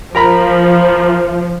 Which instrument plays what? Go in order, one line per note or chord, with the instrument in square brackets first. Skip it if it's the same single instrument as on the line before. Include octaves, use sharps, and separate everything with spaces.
[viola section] F3 [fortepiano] A#4 A#5 B5